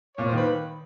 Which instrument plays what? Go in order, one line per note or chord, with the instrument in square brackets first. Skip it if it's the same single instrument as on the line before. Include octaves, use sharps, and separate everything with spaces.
[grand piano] A#2 [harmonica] C#5
[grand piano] D#3 [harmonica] C5
[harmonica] B4